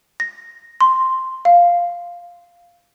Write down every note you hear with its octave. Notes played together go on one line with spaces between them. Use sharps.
A#6
C6
F5